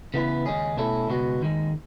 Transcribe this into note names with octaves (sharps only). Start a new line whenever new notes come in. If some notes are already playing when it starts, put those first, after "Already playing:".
C#3 E3 B3 E4 B4
D#2 C#3 G#3 C#4 G#4
B2 A3 C#4 E4 A4
C#2 B2 G#3 B3 F#4
D#2 D#3 G#3